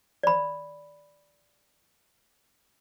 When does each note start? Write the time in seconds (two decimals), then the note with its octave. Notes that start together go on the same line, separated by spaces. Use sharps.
0.23 D5 B5